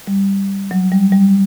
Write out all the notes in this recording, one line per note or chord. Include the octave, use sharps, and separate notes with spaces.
G3
F#3
G3
G3